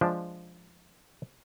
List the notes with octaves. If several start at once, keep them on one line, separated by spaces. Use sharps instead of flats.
F3 G#3 D4